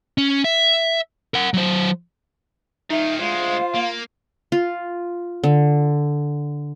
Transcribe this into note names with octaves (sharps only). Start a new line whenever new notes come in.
C#4
E5
A#4 F#5
F#3 C5
D#3 D#4 F4 E5
D2 G#3 F4 C5 F5
A#3
F4
D3